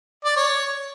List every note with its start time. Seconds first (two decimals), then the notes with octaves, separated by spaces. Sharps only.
0.25 D5
0.36 C#5